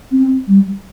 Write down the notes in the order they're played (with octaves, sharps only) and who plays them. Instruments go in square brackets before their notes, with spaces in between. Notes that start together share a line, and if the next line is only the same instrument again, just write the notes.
[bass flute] C4
G3